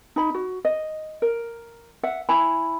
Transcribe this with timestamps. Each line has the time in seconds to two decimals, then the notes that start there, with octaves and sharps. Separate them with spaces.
0.16 D#4 B5
0.35 F#4
0.65 D#5
1.22 A#4
2.03 E5 F#5
2.29 E4 G#5 B5